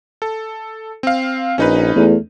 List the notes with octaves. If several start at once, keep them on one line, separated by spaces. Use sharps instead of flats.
A4
C4 F5
A#1 C#4 D#4 B4
E2 A3